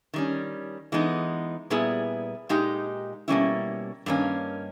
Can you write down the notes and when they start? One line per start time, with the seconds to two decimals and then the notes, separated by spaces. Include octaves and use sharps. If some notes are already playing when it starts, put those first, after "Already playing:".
0.14 D#3 G3 C#4
0.92 E3 G#3 B3 D#4
1.70 A#2 G3 B3 E4 G#4
2.49 A#2 G#3 D#4 G4
3.28 B2 G3 A#3 C#4 E4
4.06 G2 D#3 A#3 C#4